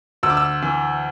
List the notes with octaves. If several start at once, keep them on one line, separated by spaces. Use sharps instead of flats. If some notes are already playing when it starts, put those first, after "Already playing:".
D2 E6
D6
E6
E3